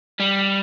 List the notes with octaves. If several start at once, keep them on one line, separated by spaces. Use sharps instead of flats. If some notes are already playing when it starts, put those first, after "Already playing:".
G3